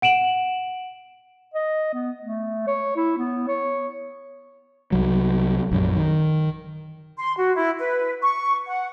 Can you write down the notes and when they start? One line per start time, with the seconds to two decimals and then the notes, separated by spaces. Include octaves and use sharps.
0.02 F#5 D7 E7 F#7
1.54 D#5
1.93 B3
2.22 A3
2.67 C#5
2.96 E4
3.18 B3
3.48 C#5
4.92 C2 F#3
5.71 A#1 F#2
5.96 D#3
7.18 C6
7.38 F#4
7.55 E4
7.79 B4
8.22 C#6
8.67 F#5